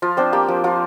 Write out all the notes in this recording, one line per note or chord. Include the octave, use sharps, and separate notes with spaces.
F3 F4
C4 D4 C5
A#3 G4
F3
F3 F4